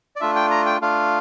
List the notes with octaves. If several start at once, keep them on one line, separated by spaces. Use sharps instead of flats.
D5
A3 D4 F4 E5
G5
A#5
G5
A3 D4 F4 F5